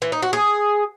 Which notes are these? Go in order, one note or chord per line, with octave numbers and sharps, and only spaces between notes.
E3
D#4
F#4
G#4